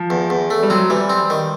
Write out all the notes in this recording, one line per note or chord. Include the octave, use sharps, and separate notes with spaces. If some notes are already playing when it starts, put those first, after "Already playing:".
Already playing: F3
E2
E2
A3
G3
F#3 C4
E3 G3
C4
D#3